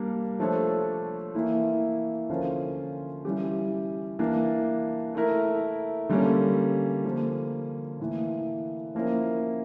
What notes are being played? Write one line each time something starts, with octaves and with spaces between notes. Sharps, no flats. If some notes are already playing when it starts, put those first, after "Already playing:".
Already playing: G3 A#3 D4
F3 A3 D4 A4 C#5
E3 A#3 E4
D3 F3 C#4 F4 A#4
E3 G3 C#4 G4
E3 A#3 D4
A3 E4 A#4
D3 G3 A#3 C#4
D3 F3 A#3
A2 E3 A#3
F3 A#3 C#4 E4 A#4